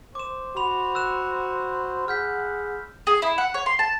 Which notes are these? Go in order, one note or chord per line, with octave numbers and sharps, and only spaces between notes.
C5 D6 E7
F#4 B5 C6 F7
E6 F#6 E7
G#4 F#5 F6 G6 B6
G#4
E4
F#5
C#5
C6
A5